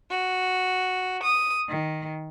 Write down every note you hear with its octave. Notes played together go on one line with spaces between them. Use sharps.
F#4
D#6
D#3